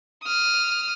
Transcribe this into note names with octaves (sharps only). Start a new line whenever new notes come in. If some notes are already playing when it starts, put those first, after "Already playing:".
D#6 F6